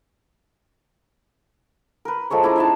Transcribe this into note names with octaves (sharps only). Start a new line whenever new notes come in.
A#4 B4
F3 G#3 A4 C#5
C#4 E4 D5 A#5
D#4 E5 A5